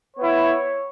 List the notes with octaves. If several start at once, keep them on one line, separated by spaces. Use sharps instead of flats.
B3 E4 C#5